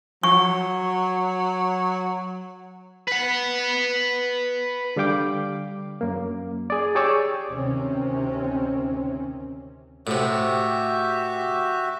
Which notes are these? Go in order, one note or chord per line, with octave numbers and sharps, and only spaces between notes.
F#3 C#6
B4 F#5
D3 G3 F5 G5 D6
F#2 A#3
G#4 D5
G4 G#4 C#5 D5 D6 E6
D2 C3 D#3 C4 C#4
A2 C3 F#4 G4 E5